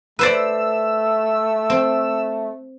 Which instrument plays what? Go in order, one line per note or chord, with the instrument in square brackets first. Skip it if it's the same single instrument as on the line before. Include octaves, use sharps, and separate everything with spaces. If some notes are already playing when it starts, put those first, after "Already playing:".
[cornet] A3 [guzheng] B4 C5 D5 [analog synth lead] E6
[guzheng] C4